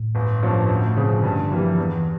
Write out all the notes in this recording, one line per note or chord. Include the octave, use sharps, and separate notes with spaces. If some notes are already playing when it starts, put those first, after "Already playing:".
Already playing: A2
G1
G2 F3 A#3 C#4
D2
C#3 F3
G2 D3
E3 F3 G3 A#3
E2 E3